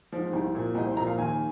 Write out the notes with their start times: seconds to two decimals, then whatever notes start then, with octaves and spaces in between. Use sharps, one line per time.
0.12 G#2 F3
0.33 C2
0.55 A#2 F3
0.75 C2 D#5
0.85 C5
0.97 A#2 F3 A#5
1.07 F5
1.18 D#2 G#5